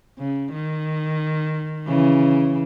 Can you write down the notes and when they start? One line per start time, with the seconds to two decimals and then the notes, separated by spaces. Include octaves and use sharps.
0.18 C#3
0.52 D#3
1.87 C#3 E3